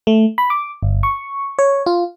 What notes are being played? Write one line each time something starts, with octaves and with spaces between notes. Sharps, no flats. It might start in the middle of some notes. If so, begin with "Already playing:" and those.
A3
B5
D6
G1
C#6
C#5
F4